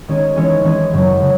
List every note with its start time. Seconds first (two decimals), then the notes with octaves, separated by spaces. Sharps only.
0.08 D#3 G#3 C#4 G#4
0.36 E3 G#3 C#4 G#4
0.64 E3 G#3 C#4 G#4
0.93 F#2 C#3 F#3
1.22 C#3